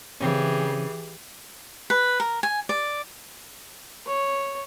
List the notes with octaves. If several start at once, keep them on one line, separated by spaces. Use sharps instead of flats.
C#3 E3 C4 C#4 G4 G#4
B4
A#4
G#5
D5
C#5